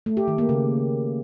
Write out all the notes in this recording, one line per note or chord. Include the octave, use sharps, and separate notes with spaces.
A3
G4
D#3
A#3
C#3